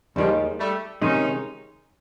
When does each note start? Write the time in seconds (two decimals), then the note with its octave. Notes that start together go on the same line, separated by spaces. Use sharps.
0.16 D#2 D#3 F3 G3 G#3
0.59 G3 A3
1.01 C3 D#3 G#3 C#4 D#4